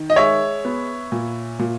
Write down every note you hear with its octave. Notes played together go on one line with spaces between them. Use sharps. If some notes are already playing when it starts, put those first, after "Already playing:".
Already playing: D#3
D#5
G#3 C#5 E5
B3
A#2
A#2